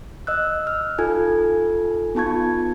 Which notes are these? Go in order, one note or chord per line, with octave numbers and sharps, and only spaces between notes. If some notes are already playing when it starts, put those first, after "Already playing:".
D#5 E6 F#6
F6
D#4 F4 A4 G#5 G#6
B3 D#4 F4 A5 C#6 G#6